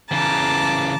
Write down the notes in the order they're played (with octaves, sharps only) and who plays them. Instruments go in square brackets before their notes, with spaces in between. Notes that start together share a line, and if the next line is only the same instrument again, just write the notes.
[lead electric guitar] C#3 E3 [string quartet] A5 A#5 D6